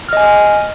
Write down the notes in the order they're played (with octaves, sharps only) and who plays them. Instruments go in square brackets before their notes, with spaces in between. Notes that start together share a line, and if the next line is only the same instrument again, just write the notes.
[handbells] F6
D#5
G#5